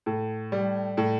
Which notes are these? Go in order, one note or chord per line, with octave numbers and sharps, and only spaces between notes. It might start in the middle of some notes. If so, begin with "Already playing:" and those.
A2
G3
A2